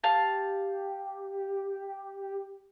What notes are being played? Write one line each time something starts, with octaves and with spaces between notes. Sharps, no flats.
G4 F5 A5